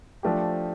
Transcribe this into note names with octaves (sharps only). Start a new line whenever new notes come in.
F3 A3 D4 G4